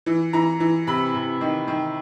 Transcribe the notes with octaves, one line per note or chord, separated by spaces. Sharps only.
E3
E3 A#5
E3
C3 B5
C3
D#3
D#3